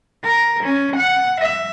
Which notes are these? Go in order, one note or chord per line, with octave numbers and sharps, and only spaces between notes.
A#4
C#4
F#5
E5